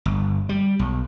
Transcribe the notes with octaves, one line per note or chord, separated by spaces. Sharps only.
G1
G3
B1